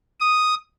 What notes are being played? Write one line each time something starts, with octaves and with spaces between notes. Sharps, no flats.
D#6